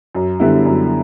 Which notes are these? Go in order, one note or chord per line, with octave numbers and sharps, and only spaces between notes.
F#2
D3 G3 B3 E4
F#2